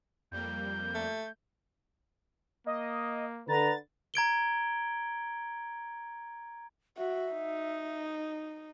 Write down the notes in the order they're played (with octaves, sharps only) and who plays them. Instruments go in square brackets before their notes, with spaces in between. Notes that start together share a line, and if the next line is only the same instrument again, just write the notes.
[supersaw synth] F2 G3 A#3 [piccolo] G6
[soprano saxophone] A3
[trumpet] A#3 [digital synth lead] D#5
[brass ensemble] D3 B4 [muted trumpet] A#5 [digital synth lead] A6
[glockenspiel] A#5 G#6 D7 G7
[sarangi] F#4 [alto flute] E5
[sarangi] D#4